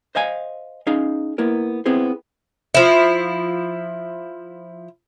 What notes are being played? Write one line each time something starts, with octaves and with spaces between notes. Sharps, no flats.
C5 D#5 F5 G#5
C#4 D#4 G#4 F5
A#3 B3 E4 A#4
B3 C4 E4 G#4 C5
F3 E4